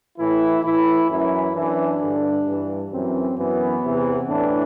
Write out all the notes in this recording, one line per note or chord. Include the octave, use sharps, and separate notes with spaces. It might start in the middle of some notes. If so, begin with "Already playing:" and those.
A2 E3 E4
A2 E3 E4
F#2 E3 E4
F#2 E3 D4
G2 D3
G2 E3
F#2 E3 C4
F#2 E3 B3
E2 C3 E3
A2 E3 D4